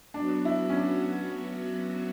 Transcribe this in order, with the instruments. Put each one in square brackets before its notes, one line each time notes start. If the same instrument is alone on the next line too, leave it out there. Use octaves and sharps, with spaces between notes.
[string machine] F#3 B3 F#4 [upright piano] D4
[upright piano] E4
C#4
D4